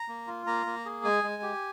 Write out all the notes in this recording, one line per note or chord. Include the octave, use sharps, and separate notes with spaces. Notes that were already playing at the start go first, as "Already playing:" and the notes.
Already playing: A#5
A#3
F4
A#3 A#5
A#3
G#4
G#3 G#5
G#3
G4